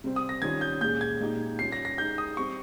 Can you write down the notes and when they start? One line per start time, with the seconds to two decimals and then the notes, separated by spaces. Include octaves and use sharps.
0.04 C3 G3 C4
0.16 D#6
0.29 A#6
0.42 D#3 G3 C#4 F4 G#6
0.61 G6
0.81 A#2 G#3 C#4 G#4 G6
1.01 G#6
1.20 A#2 G#3 D#4 G4
1.59 G3 C#4 F4 C7
1.72 A#6
1.85 A#6
1.98 G#3 D#4 G4 G6
2.18 D#6
2.37 G3 C4 G4 C#6